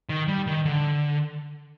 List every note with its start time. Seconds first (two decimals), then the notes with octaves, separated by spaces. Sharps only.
0.09 D#3
0.28 G3
0.47 D#3
0.65 D3